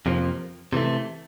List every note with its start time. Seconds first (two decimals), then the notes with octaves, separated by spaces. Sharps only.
0.06 F2 C3 F3 A#3
0.73 C3 E3 A3